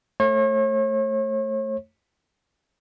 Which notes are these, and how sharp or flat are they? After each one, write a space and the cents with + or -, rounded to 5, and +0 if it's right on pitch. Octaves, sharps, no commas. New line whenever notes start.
A3 +0 C#5 -40